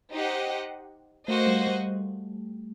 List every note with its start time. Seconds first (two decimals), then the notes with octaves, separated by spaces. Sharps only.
0.12 D#4 G4 C5 D#5 F#5
1.27 A3 A#3 F#4 C5 D#5
1.47 G3
1.67 G3